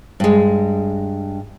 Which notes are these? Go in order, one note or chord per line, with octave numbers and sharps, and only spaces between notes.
G2 G#3